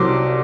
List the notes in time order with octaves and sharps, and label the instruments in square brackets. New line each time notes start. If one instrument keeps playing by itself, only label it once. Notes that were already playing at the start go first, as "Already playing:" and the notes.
Already playing: [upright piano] C2 C3 F#3 C4 C6 D6